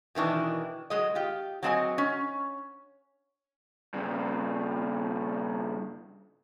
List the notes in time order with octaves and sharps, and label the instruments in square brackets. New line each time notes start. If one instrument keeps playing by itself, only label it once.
[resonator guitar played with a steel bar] B2 D#3 E3 D4
F#3 G#3 D#5
F4 G4
F#3 G#3 C4 D#5 F#5 G#5
C#4
[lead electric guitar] G2 C#3